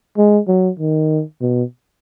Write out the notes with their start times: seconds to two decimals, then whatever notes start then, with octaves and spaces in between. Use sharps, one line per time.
0.18 G#3
0.48 F#3
0.79 D#3
1.41 B2